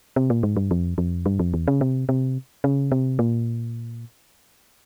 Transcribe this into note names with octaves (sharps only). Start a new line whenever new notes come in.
C3
A#2
G#2
G2
F2
F2
G2
F2
E2
C#3
C3
C3
C#3
C3
A#2